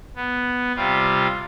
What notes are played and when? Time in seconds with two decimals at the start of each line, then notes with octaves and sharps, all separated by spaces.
0.16 B3
0.76 C3 G3 F4